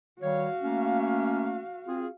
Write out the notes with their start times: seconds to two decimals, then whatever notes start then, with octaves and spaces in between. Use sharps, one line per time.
0.21 D#3 G3 F#4 C#5 F5
0.61 A3 A#3 C#4
1.87 C4 F4 G#4